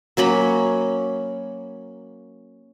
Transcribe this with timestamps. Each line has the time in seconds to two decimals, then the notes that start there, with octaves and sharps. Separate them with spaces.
0.17 F#3 A#3 C#4 B5